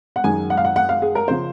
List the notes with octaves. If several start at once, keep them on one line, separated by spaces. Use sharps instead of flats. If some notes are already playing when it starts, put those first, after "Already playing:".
F#5
F#2 D#3 G#3 G#5
F#5
F5
F#5
F#5
F5
G#4
A#4
C#3 F3 C5